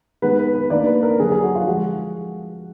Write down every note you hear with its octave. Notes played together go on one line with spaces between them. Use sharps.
D#3 G#3 B3 B4
B4
B4
D#3 A#3 D4 D5
B4
A#4
D3 F#3 D4 G#4
G#4
F#4
F4
F3 G#3 F#4